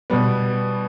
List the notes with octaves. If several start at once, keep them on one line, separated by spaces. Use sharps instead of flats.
B2 G3 B3